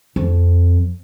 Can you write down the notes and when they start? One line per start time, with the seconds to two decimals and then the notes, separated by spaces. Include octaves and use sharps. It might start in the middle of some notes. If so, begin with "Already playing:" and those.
0.16 F2